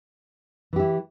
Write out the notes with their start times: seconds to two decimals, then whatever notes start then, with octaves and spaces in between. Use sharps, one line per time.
0.73 E3
0.76 G4
0.79 E4